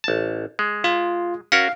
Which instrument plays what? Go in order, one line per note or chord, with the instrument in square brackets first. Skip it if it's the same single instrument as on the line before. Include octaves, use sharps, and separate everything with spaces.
[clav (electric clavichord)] A1 A5
G#3
[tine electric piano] F4
[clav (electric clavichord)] C#4 F#4 A#4 [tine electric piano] F5